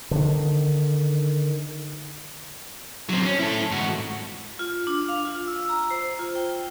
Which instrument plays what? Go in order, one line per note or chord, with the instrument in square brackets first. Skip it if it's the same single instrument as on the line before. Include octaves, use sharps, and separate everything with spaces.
[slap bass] D3 D#3
[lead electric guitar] F#3 C4
C#4
E4 A4
G#2 F#4
[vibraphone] F4
D4
F5
F4
E6
A#5
C5
F4
G5